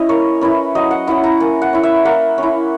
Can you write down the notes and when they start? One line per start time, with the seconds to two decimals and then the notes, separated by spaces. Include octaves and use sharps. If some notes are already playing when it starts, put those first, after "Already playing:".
Already playing: C#4 E4 D#5
0.09 A#3 C#5
0.41 C#4 E4 B4
0.75 F#3 D#5
0.91 F#5
1.07 C#4 E4 F#5
1.24 A#5
1.40 A#3 G#5
1.62 F#5
1.73 C#4 E4
1.83 E5
2.05 A#3 F#5
2.38 C#4 E4